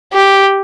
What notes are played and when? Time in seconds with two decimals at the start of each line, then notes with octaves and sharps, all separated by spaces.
0.13 G4